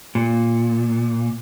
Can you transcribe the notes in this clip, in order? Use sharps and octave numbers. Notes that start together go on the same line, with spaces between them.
A#2